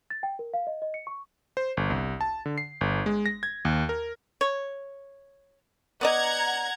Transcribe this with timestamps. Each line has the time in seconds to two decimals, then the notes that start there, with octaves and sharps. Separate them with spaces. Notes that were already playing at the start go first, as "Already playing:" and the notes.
0.10 A6
0.23 G5
0.39 A#4
0.54 F5
0.67 D#5
0.82 D#5
0.94 C#7
1.07 C#6
1.57 C5
1.77 G1
1.90 C2
2.21 A5
2.46 D3
2.58 C7
2.81 G1
3.06 G#3
3.26 A#6
3.43 G#6
3.65 D#2
3.89 A#4
4.41 C#5
6.01 B3 D5 D#5 F#5 A#5 G#6